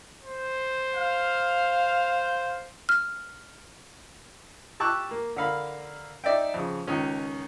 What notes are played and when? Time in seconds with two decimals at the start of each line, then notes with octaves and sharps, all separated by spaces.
0.22 C5
0.95 F5
2.89 F6
4.80 G4 A5 C#6 D6 E6 F#6
5.11 A#3
5.36 D3 A#4 F5 B5
6.24 D#4 D5 E5 G5
6.54 F2 C#3
6.87 C#2 D#3 C#4